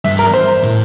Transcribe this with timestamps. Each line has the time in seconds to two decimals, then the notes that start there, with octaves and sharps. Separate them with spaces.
0.04 G2 E5
0.19 A#4
0.34 C5
0.63 A2